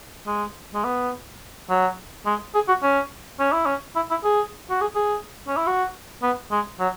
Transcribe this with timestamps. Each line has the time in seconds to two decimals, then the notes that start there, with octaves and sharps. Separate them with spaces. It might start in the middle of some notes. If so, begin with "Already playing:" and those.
0.27 G#3
0.74 G#3
0.84 B3
1.70 F#3
2.26 G#3
2.55 G#4
2.68 F#4
2.82 C#4
3.39 C#4
3.52 E4
3.66 C#4
3.96 E4
4.11 E4
4.24 G#4
4.70 F#4
4.81 G#4
4.95 G#4
5.47 C#4
5.57 E4
5.67 F#4
6.22 B3
6.51 G#3
6.80 F#3